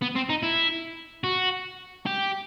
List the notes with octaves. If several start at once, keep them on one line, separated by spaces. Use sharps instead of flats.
B3
C4
D#4
E4
F#4
G4